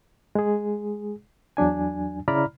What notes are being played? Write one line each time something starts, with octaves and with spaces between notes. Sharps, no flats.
G#3 G#4
E2 F#3 D4 G#5
C#3 E4 D5 A#5 B5 F6